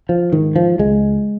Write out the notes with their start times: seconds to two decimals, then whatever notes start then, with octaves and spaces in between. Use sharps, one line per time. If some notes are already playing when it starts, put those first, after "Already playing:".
0.09 F3
0.32 G#2 D#3
0.56 F3
0.79 C#2 G#3